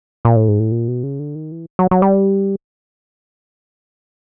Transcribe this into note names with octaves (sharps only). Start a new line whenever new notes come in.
A#2
A2
G#2
A2
A#2
B2
C#3
D3
D#3
E3
F#3
F#3
G3